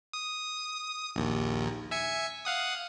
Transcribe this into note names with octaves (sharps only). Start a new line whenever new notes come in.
D#6
A#1 D#2
E5 G#5 C#7
F5 F#5 D#6